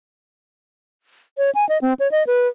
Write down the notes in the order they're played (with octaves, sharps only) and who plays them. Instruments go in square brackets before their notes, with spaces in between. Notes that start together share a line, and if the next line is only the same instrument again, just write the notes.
[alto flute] C#5
G#5
D#5
C4
C#5
D#5
B4